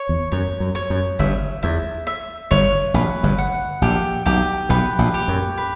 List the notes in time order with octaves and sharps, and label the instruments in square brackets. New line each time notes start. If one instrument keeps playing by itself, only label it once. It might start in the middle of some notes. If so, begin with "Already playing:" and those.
Already playing: [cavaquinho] C#5
[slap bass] E2
[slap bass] F#2 [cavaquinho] C#5
[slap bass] F#2
[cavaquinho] C#5
[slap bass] F#2
[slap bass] G1 G2 [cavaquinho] E5
[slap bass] E2 [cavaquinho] E5
[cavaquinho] E5
[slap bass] G1 G2 [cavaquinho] C#5
[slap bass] A#1 A#2 [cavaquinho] B4
[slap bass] G1 G2
[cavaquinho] F#5
[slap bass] A#1 A#2 [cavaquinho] G4
[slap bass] B1 B2 [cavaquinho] G4
[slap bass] B1 B2 [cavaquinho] B4
[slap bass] A#1 A#2
[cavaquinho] G4
[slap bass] F#2
[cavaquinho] B4